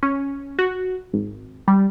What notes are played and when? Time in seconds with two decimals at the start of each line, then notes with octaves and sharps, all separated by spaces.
0.03 C#4
0.59 F#4
1.13 G#1
1.68 G3